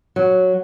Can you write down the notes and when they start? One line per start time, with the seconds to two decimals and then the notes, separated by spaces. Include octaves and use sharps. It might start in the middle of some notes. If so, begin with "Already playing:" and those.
0.16 F#3